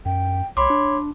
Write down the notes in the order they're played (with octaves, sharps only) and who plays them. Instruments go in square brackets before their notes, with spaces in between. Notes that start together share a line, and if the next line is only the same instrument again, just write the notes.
[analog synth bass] F#2 [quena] G5
[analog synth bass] C2 [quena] C#5 [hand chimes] B5 C6 D6
[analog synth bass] D4